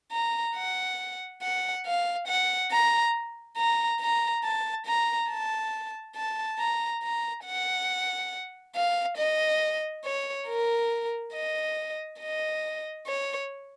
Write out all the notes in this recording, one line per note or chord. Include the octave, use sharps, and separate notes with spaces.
A#5
F#5
F#5
F5
F#5
A#5
A#5
A#5
A5
A#5
A5
A5
A#5
A#5
F#5
F5
D#5
C#5
A#4
D#5
D#5
C#5